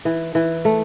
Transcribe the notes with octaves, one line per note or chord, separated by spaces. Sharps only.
E3
E3
A3